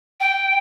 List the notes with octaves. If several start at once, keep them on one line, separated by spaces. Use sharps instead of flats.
G5